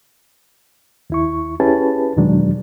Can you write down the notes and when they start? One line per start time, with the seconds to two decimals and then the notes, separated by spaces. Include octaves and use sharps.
1.10 D#2 E4 C#6
1.60 C#4 E4 G4 G#4 B4 A5
2.17 E2 B2 D#3 F#3 G#3 D4